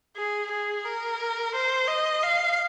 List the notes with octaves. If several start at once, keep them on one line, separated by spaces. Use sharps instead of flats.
G#4
G#4
A#4
C5
D#5
F5